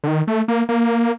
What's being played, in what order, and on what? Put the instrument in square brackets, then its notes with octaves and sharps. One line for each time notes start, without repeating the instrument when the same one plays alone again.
[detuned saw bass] D3
D#3
A3
A#3
A#3